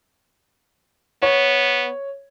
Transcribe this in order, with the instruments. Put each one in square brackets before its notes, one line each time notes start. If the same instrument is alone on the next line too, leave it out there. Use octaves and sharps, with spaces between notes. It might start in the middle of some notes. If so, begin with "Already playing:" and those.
[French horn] B3 [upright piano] C#5